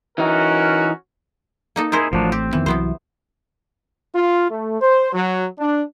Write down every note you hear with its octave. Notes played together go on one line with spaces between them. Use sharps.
E3 C#4 D#4 F#4 A#4
A#3 D#4 A4
C4 D#4 E4 G#4 A#4 C5
A1 A2 F3 F#3 D4
C4 G4
F2 D#3 E3 B3
C2 C3 E3 F#3 B3 C5
F4
A3
C5
F#3
D4